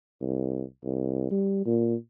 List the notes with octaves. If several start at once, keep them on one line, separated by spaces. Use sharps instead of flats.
C2
C2
G3
A#2